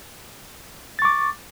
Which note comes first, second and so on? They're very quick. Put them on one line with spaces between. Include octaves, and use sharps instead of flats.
A6 C#6 D6